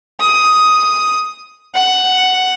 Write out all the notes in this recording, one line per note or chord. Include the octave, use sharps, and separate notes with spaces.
D#6
F#5